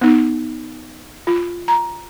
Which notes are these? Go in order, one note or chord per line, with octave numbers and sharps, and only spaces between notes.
B3 D#4
F4
A#5